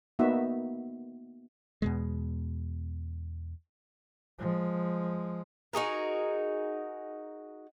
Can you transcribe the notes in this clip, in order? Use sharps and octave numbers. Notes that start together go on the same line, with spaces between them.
A#3 B3 D#4 F#4 E5
E2 B2 G#3
F3 G#3
D#4 F#4 G#4 A#4